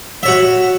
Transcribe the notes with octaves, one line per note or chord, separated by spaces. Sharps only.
F#4 C#5 E5